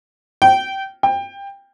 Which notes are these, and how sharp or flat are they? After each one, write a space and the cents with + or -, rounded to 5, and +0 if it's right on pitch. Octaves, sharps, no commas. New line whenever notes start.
G5 -20
G5 +20